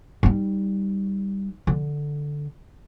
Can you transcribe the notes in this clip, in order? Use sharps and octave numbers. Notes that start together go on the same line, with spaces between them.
G3 D#4
D3